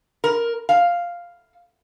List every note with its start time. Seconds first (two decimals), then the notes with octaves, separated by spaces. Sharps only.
0.24 A#4
0.69 F5